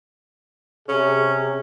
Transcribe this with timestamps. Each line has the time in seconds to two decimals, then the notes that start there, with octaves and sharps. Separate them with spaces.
0.89 C3 C#4 G#4